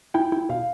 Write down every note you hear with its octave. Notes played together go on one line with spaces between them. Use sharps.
E4 G5
E4
B2 F5